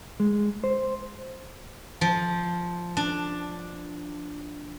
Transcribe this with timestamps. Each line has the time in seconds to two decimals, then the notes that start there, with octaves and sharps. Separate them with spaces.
0.20 G#3
0.64 C5
2.01 F3
2.97 D4